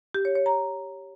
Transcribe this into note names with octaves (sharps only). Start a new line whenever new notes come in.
G4
C#5
C#5
A#5